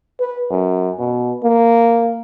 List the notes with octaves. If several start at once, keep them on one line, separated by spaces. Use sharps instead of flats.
B4
F#2
B2
A#3